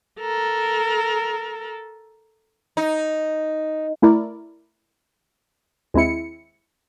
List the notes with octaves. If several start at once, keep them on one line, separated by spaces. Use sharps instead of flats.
A4 A#4
D#4
A3 E4 A#4 D5
D#2 G#3 C4 E4 C#7